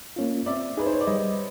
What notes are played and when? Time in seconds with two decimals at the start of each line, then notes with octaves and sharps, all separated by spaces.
0.16 A#3 C#4 F4
0.46 C4 D5 E5
0.77 D#4 G#4 B4
0.86 C5
0.93 C#5
1.01 D5
1.07 G3 C#5 D#5